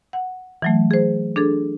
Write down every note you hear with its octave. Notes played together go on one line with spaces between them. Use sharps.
F#5
E3 F#3 A3
G#4 C5
D4 G#4 A4